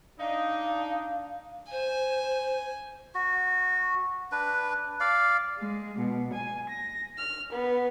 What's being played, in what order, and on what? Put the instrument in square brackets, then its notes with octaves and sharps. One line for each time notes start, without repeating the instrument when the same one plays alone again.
[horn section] D4 D#4 [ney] F5
[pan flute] C5 [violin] G#5
[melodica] F#4
D4 B4
D5 F5
[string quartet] G#3
B2
G#5
A#6
F6
B3